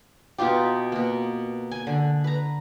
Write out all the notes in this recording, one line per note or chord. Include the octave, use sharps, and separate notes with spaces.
B2 D#4 F4 G4
B2 A#3
G#5
D3
B4 A#5